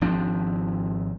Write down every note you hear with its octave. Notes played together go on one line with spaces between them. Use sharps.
G#1 F3 C4 D4